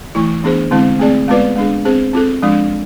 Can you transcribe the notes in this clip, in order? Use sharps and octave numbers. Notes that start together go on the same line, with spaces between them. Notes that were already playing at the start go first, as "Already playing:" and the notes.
E3 A3 E4
E3 B3 D4 G#4 C5
D3 G#3 C4 E4
A3 C4 G#4 D5
G#3 B3 F4 B4 D5
G#3 D4 G#4
C4 G#4 C5
C4 F4 A4
F3 G#3 D4 F4